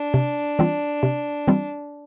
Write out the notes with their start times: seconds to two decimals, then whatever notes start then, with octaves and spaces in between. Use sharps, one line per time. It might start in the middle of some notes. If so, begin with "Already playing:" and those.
Already playing: D4
0.14 C3
0.59 E3 G3 C4 F4
1.03 C3
1.47 E3 G3 C4 F4